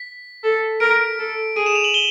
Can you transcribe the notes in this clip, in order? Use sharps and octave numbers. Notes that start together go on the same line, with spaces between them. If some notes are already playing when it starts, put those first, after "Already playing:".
Already playing: B6
A4
A#4 D7
A4
G#4 D#7
E7
F7
F#7
G7